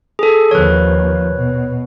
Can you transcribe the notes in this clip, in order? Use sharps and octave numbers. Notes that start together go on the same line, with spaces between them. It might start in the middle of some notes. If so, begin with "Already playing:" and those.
G#4 A4
D#2 F3 B4 C#5
B2